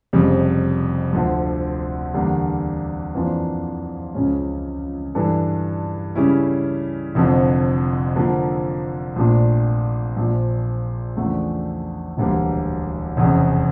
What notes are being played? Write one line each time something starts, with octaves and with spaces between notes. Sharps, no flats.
F1 F2 C#3 G3
D2 D3 F3
E2 D3 G3 A#3 D4
F2 E3 A#3 D4 F4
C#2 C#3 F3 C#4
G2 E3 G3 D4 A4
C#3 G3 C#4 E4
F1 F2 D3 F3
D3 F3 A#3
A#1 A#2 A3 D4
A#1 A#2 F3
E2 C#3 F3 A3 D4
E1 D2 D3 G3 A#3
F1 E2 C#3